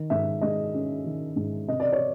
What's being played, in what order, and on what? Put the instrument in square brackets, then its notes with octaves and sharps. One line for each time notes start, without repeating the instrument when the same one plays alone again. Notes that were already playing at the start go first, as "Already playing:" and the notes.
Already playing: [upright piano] D#3
G#2 E5
G#3 D#5
C#4
D#3
G#2
C3 D#5
D5
C#5